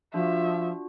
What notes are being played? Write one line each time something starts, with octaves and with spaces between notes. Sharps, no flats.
F3 D4 F4 F#4 E5